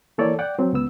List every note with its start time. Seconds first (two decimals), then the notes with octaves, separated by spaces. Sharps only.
0.18 E3 A#3 A4 C#5 D5
0.39 D5 F#5 G5 D6
0.59 F#3 C4
0.73 C#2 B3 E6